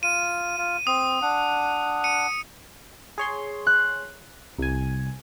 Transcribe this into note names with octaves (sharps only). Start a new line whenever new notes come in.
F4 D#7
F4
C4 D#6
D4 F#5
C#7 D#7
G#4 C#5 C6
F#6
C2 G#5